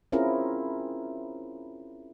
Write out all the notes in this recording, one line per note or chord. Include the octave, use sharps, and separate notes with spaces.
C4 C#4 E4 F4 G#4 A#4